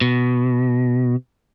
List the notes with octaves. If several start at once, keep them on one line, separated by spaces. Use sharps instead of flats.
B2